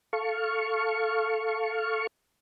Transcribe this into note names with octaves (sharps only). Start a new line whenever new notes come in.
A4 F5 C#6